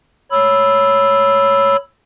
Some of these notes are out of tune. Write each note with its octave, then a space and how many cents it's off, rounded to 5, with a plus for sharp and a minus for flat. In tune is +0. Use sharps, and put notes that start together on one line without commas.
C#5 +0 B5 +0 E6 +0